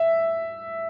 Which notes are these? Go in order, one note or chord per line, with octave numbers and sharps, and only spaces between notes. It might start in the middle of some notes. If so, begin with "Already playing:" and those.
Already playing: E5